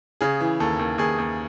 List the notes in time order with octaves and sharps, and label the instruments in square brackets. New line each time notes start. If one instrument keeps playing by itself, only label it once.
[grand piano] C#3 G#4
E3
D#2 A4
D#2
D#2 G#4
D#2